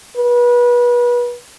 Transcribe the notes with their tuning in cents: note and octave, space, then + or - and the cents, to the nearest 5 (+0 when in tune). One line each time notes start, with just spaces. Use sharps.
B4 -30